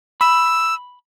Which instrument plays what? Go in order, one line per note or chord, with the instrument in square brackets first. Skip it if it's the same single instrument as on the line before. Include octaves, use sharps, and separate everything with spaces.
[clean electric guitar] B5 [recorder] E6